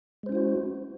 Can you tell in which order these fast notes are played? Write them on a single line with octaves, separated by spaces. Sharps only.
G#3 C5 C#4 E4 F#4